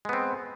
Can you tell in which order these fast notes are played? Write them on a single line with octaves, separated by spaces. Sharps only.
G#3 B3 C4